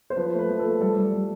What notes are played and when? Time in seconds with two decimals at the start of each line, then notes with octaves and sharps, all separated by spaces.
0.10 C5
0.16 F3 B4
0.33 A3
0.39 B4
0.48 F3
0.59 A4
0.65 A3
0.81 G3 A4
0.97 G3
1.13 G3